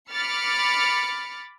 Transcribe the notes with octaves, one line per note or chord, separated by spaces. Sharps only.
B5 D6 F6 A6 C#7